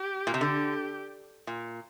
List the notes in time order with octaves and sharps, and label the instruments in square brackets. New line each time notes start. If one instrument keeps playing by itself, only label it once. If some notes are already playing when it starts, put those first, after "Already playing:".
Already playing: [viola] G4
[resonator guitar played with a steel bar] A#2
C3
[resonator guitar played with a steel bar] D3 [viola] G4
[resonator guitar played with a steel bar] A#2